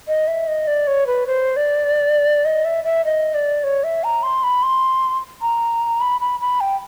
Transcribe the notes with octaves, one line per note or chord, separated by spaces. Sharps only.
D#5
E5
D#5
D5
C#5
B4
C5
D5
D#5
E5
E5
D#5
D5
C#5
E5
A#5
C6
B5
C6
A#5
B5
B5
B5
G5